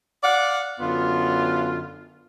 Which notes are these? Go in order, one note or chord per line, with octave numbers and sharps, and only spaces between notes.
D5 F5 F#5
F#2 D3 B3 F4